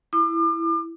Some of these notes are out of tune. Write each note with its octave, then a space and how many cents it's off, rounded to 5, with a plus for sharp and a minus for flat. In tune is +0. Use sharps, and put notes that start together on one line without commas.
E4 +5 D6 +40